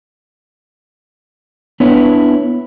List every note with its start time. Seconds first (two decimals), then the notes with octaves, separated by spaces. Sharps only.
1.80 B3 D4 E4 B4 C#5